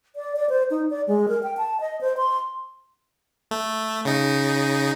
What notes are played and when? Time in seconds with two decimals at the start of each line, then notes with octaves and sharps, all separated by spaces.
0.16 D5
0.36 D5
0.49 C5
0.71 D#4
0.90 D5
1.08 G#3
1.29 A#4
1.43 G5
1.57 A5
1.81 D#5
2.01 C5
2.17 C6
3.51 A3
4.05 C#3 D#4